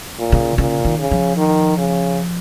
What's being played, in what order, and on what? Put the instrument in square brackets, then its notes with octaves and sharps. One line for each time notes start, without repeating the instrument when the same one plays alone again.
[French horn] A#2
[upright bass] C#3
[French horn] A#2 [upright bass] C#3
[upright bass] D#3
[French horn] C#3
[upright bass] F3
[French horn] D#3
C#3